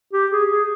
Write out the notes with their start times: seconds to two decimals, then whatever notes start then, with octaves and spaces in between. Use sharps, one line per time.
0.13 G4
0.31 G#4
0.50 G#4